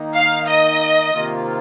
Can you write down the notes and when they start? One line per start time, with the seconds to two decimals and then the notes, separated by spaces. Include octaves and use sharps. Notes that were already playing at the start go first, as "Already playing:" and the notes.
Already playing: D#3 A#3 D#4
0.15 F5
0.48 D#5
1.14 C3 D#3 A#3 F4